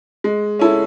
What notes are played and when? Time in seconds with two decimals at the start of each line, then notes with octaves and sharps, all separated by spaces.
0.24 G#3
0.59 C#4 E4 A4